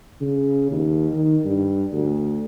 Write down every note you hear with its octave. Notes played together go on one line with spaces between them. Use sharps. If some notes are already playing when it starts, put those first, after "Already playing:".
C#3
D#2
D#3
G2
D2